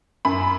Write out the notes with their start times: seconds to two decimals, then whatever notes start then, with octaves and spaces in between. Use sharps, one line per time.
0.25 F#2 B5